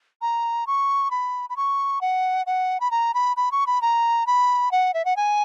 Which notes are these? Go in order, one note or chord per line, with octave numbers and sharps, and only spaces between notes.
A#5
C#6
B5
B5
C#6
F#5
F#5
B5
A#5
B5
B5
C#6
B5
A#5
B5
F#5
E5
F#5
G#5